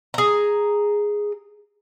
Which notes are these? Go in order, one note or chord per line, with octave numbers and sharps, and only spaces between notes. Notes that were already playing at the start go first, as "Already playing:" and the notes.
G#4 A#5